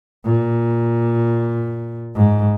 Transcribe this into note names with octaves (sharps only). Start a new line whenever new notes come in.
A#2
G#2